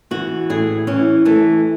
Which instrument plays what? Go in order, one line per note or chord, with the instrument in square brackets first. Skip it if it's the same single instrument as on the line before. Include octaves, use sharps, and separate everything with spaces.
[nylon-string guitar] E3 F#4
A2 G#4
E3 C#4
E3 A3